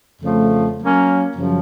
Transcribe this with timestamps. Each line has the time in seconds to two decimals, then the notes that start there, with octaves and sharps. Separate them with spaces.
0.21 F2 C#3 F3 A3
0.78 F#3 A#3 C#4
1.35 F#2 C#3 F3